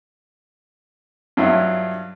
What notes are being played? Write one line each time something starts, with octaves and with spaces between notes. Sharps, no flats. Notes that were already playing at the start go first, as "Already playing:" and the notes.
G2 F#3 E4 F4